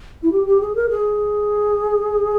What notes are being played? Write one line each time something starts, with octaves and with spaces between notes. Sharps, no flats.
E4
G4
G4
G#4
A#4
G#4